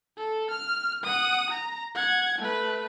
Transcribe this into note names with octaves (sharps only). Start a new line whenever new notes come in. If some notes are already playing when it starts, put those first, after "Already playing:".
A4
F6
F#5 D#6
A#5
F#5 G#6
A3 B4